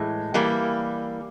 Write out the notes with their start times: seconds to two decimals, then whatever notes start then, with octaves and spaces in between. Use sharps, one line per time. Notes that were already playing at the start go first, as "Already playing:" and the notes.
Already playing: A2 E3 G#3
0.34 E3 G3 A#3